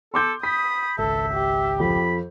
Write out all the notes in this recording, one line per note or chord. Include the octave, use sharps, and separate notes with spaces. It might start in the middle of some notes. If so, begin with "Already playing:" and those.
A4 C6 D6 G6
B5 D#6 B6
G#1 C#2 A4 E5
G4
F2 B5